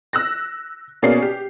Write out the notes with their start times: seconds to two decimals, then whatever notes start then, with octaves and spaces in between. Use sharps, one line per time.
0.13 E6 F#6 A#6
1.02 B2 A#3 C#4 G#4 D5 C7
1.23 G4